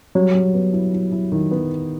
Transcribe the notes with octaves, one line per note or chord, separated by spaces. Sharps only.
F#3 G3
G3
B3
E4
E4
E4
D#3
B3